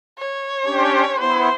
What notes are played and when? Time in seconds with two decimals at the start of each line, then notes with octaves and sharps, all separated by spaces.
0.18 C#5
0.65 C#4 D4 G4
1.20 B3 E4 C5